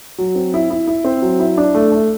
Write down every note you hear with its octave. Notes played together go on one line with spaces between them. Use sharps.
F#3
C4
E4
E4
E4
C4
F#3
E4
D4
A3
A3